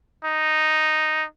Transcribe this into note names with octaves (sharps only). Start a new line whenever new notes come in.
D#4